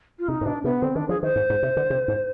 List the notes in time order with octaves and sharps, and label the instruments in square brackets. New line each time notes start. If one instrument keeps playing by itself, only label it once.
[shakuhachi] F4
[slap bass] C3 [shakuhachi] D#4
[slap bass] G#2
[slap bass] B2 [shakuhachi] D4
[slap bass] C3 [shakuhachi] B3
[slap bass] D3 [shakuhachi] C4
[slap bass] D#3 [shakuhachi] D4
[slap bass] F3 [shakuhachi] G#4
[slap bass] D#3 [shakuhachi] C5
[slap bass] G#2
G#2
C3
D3
C3
G#2